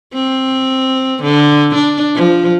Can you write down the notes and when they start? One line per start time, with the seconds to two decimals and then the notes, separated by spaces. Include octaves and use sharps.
0.14 C4
1.23 D3
1.75 D4
2.15 F3